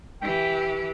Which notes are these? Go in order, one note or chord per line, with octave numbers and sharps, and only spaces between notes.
E3 G4 G5